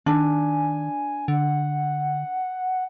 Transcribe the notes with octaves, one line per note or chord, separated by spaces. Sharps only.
D#3 D4 G#5
D3 F#5